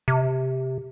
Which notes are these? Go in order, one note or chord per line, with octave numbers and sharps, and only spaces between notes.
C3